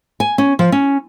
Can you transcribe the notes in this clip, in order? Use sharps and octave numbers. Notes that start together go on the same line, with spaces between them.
G#5
C#4
F3
C#4